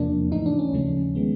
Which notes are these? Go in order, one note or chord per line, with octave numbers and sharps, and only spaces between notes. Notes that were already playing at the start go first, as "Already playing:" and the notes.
Already playing: E2 C3 F3 A#3 D4
G#2 E3 A3 D#4
D4
C#4
D#2 C#3 F3 A3
D#3 G#3 B3